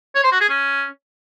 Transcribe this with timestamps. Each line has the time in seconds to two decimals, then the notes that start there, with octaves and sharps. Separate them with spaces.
0.15 C#5
0.24 C5
0.32 F#4
0.41 G#4
0.49 C#4